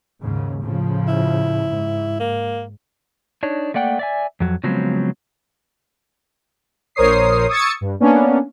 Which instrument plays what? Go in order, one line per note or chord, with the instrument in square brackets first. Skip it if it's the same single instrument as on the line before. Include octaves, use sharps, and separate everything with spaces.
[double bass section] D#2 G#2 C#3
A2 C#3 F3
[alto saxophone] E4
[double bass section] G#2
[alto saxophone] A#3
[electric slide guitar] D4 D#4 C#5
A3 A#3 D5 F#5 G5
D5 E5 G#5
F2 F#3
C#3 F3 F#3 G#3 B3 C4
[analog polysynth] A#1 A#4 C5 C#5 D#6 C7
C#6 D#6 E6 G#6 A6 C#7
G2
A#3 B3 C#4 D4